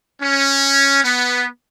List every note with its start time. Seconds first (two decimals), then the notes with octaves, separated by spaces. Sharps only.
0.22 C#4
1.03 B3